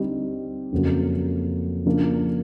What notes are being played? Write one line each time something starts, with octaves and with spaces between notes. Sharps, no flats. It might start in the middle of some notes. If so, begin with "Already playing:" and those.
Already playing: D3 G3 C4 D#4 G4
F2 C#3 F#3 A#3
C#3 F3 A#3 D4